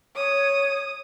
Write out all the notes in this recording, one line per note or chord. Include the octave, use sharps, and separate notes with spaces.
C#5 D#6